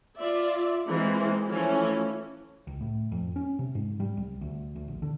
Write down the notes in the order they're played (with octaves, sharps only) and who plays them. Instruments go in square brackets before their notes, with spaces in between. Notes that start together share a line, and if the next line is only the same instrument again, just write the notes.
[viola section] F4 D5 E5
E3 G#3 A#3 C4
E3 F3 A3 C#4
[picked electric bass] C#2
A2
F2
C#4
C3
G#2
G3
C2
D2
D2
A#1
D3